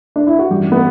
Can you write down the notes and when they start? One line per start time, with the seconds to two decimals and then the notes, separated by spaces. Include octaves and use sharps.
0.16 D4
0.27 E4
0.39 F#4
0.49 A1 G2 E3 G4
0.72 B3